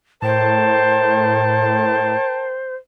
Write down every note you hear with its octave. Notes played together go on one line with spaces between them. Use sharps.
A2 A#4 C5 G5 A5